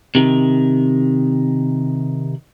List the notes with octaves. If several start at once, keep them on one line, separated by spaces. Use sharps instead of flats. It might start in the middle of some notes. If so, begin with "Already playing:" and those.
C3 D#3